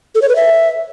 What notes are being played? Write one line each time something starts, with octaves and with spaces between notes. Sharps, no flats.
A4
C#5
B4
E5